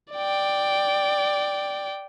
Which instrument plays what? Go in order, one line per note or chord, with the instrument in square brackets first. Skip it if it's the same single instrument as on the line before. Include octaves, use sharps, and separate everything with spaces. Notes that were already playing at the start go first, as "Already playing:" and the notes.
[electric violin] D5 G5